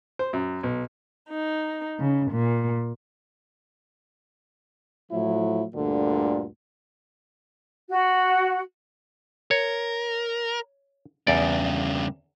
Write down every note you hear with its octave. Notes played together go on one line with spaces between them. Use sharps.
C5
F#2
B1
D#4
C#3
A#2
A2 F3 F#3 E4
D2 G2 A#2 D3
F#4
A#4 C#5
E2 G2 C#3 D5